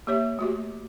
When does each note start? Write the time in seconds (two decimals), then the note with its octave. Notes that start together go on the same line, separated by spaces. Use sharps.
0.07 A#3 G4 C#5 E5
0.39 A3 F#4 G4